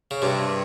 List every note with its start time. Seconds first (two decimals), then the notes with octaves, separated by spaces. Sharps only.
0.11 C#3
0.22 G2 C3